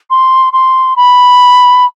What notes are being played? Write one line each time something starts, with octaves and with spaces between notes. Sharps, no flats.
C6
C6
B5